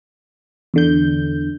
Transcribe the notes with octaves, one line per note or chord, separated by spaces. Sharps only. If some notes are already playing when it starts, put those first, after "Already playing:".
E2 D3 G6